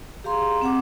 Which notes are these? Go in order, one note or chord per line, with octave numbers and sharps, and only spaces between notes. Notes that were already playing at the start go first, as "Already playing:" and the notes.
G4 G#4 F5 A#5 C6
C4 F#5 D6